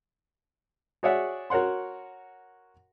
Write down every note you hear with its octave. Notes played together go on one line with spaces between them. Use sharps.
F#4 G#4 C#5 D5 E5 F#5
F#4 A#4 C#5 F#5 C6